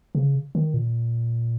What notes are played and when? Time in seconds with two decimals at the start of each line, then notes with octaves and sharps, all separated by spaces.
0.15 C#3
0.55 D#3
0.74 A#2